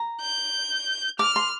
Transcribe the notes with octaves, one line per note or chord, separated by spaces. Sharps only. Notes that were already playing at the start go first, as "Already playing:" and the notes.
Already playing: A#5
G6
D6 F6
C6